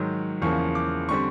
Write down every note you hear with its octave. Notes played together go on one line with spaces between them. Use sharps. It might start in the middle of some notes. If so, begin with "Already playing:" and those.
Already playing: G#2 D#3 F#3
E2 C#3 F3 A#3 C#6
D6
D3 G3 C4 C#6